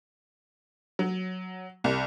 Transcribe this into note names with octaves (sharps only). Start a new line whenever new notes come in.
F#3
C2